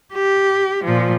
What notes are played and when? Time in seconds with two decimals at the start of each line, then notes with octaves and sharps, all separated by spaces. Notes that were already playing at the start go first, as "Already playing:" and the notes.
0.14 G4
0.85 A#2 F3